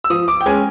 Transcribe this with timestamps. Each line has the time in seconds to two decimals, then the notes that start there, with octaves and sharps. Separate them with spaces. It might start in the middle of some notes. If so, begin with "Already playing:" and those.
0.04 E6
0.10 F3 D#6
0.28 D6
0.41 G5
0.46 G#3 C#4 G#5